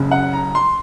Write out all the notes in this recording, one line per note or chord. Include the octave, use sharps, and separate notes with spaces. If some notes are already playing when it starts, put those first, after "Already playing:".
Already playing: F#1 F#2 C#3
F#5
A#5
C6